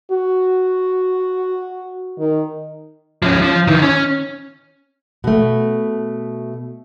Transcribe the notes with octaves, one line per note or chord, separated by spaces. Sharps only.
F#4
D#3
F3 C#4
F3
D#3 E3
C#4
B2 A3